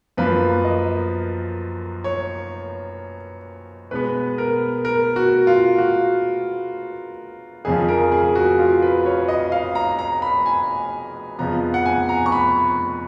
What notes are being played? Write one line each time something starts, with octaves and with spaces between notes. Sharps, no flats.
F#2 F3 A#3 B4
D#5
C#5
B2 G#3 B3 B4
A#4
A#4
F#4
F4
F#4
F2 C#3 F3 G#4
A#4
G#4
F#4
F4
B4
C#5
D#5
F5
A#5
A#5
B5
G#5
F2 C#3 F3 B3 A#5
F#5
G#5
A#5
C#6
B5